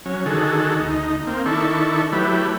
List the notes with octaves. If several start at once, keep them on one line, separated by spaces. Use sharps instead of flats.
F#3 C#4
D3 D#3 F#4 G#4 A4
D2 D#4
A#3 C4
D#3 D4 E4 A4 C#6
F#3 A3 E4 G4 B4